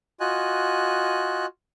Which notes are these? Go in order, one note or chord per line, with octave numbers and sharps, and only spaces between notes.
F4 F#4 D#5 G#5 F#6